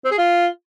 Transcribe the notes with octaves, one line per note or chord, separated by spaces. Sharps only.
C4
G#4
F4